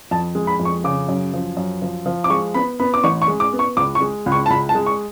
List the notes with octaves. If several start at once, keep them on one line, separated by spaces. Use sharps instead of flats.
F2 A5
G#3
B5
F2
C#6
C#3 D6
F#2
F3
F#2
F3
F3
D6
G#3 C#6
B3 B5
B3 B5
D6
A1 C#6
C#6
G#3
D6
B3
C#6
C#2 D6
C#6
G#3
C#2
C#6
A5
C#2 B5
A5
G#3
C#6